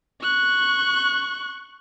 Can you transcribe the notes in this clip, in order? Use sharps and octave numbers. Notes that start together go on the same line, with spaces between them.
C#6 F#6